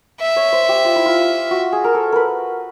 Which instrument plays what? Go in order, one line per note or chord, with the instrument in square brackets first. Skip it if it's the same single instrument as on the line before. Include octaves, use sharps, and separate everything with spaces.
[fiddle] E5
[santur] C#5
C5
G4
F4
E4
F4
F#4
G#4
A#4
A4
A#4 B4